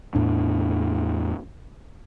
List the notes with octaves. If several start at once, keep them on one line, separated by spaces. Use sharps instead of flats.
E2 A2 D4